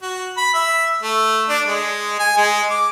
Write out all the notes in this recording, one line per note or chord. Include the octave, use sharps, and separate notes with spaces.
F#4
B5
E5
A3
D4
G#3
G#5
G#3
D6